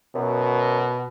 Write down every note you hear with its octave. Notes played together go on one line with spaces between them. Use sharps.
F#2 B2